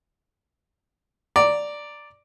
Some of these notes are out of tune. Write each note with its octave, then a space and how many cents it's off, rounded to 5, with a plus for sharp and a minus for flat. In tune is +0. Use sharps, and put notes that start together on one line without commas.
D5 +0 A#5 +0